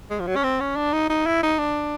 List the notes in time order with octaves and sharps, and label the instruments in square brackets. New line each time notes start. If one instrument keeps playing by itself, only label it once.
[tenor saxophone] G#3
F3
F#3
C#4
C4
C#4
D4
D#4
D#4
E4
D#4
D4